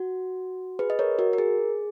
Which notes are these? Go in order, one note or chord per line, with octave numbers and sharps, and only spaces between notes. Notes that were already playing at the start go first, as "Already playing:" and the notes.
Already playing: F#4
G#4 B4
D#5
A#4 C#5
F#4 A#4
A#4
G#4